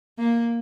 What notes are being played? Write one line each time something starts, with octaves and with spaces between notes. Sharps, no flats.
A#3